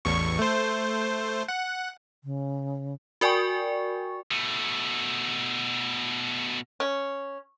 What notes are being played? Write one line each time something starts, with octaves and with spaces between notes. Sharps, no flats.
A1 E2 C#6
A3 C5
F#5
C#3
F#4 A#4 D5 G5 G#5 C#6
B2 A3
C#4